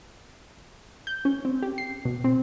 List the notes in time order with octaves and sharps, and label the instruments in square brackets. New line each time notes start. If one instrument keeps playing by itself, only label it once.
[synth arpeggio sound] G6
C#4
C4
G4
C7
B2
C4